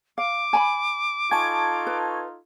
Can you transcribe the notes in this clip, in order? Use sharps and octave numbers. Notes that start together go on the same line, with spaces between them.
F5 D6
G#5 A#5 B5
D#4 F4 A4 G#5 A5 C#6 G#6
B4